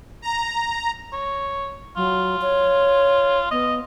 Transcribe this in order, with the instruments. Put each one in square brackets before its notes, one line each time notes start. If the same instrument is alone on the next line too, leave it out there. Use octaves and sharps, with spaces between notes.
[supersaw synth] A#5
[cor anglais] C#5
[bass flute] F#3 [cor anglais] F4
[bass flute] C#5
[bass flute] B3 [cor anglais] D#5